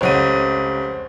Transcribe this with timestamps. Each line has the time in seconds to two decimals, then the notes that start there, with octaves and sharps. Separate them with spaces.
0.01 F1 C#2 C5 C#5 F#5 D#7